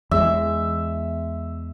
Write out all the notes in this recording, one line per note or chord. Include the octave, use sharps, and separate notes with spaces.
E2 G#3 E5